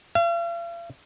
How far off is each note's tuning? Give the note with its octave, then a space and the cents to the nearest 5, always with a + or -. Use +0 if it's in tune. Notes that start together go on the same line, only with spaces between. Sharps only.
F5 -45